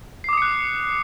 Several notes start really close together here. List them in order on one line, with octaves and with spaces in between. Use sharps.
C7 D6 D#6 C#7 F#6